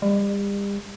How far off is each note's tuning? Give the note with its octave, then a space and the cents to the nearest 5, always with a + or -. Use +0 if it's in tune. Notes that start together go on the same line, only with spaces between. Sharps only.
G3 +40